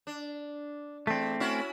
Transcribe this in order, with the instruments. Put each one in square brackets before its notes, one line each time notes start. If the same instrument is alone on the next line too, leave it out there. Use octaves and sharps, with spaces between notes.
[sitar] D4
[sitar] E2 A4 [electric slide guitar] A3 C4
[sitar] C#4 E4 F#4